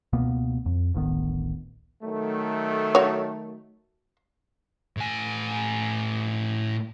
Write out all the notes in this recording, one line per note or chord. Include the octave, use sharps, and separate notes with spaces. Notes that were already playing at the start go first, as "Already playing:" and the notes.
C#2 B2 A#3 B3
F2
D1 A1 D#3 B3
D#3 F#3 A3
F#4 C#5
A2 G#5